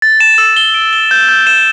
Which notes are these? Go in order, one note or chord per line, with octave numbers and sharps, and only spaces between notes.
A6
E7
E6
G7
D7
G7
G6
G6
E7